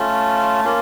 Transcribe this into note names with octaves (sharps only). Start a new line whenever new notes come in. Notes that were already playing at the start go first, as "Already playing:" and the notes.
Already playing: A3 C#4 F4 A5
A#3 C#4 F4